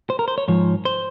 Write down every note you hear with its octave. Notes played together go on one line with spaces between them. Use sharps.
C5
A#4
C5
C#5
G#2 F3 C#5
C5